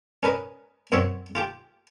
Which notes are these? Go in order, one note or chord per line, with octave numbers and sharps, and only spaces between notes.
C#4 A#4 B4 D#5
F#2 C4 F#4 C#5 E5
F4 G4 G5